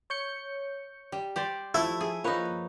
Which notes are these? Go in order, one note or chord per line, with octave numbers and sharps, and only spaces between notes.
C#5 G6 C#7
G3
G4 C5 D5
F3 A3 E4
G#4
F3 A#3 D#4 B4 C#5